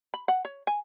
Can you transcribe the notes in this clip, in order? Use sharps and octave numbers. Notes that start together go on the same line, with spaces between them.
B5
F#5
C#5
G#5